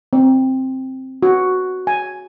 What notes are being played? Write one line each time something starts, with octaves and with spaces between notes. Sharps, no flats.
C4
F#4
G#5